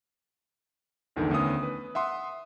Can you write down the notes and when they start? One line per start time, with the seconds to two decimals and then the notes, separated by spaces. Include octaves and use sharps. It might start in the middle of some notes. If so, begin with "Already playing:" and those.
1.16 A#1 E2 D3 D#3
1.31 D2 D#3 B3 C#4 D#6
1.63 B4
1.95 E5 F#5 C6 D#6